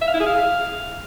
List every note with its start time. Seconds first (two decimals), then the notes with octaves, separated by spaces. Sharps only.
0.01 E5
0.08 F5
0.14 E4
0.20 G#4
0.26 F5